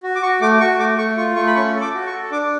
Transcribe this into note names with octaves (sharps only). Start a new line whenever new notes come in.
F#4
D6
F#4 C#6
A3 D6
F#4 C#6
A3 D6
A3 C#6
F4 C#6
A3 C#6
B5
C#4 C#6
A4
D6
F#4
C#6
A4
D4 D6